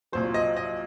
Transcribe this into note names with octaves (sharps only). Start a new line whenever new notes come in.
C2 A#2 F#3 C5
D#5
D#5